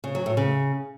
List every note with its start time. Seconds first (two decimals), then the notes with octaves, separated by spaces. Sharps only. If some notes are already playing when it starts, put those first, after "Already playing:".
0.04 C#3
0.15 F#3
0.26 A2
0.37 C#3